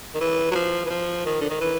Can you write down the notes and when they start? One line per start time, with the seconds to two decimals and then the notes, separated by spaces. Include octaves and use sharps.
0.14 D#3
0.21 E3
0.51 F#3
0.55 F3
0.85 E3
0.90 F3
1.26 D#3
1.41 D3
1.50 D#3
1.61 E3